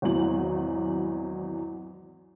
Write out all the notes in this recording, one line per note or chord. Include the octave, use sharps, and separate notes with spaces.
G#1 E2 B2 E3 F#3 F#7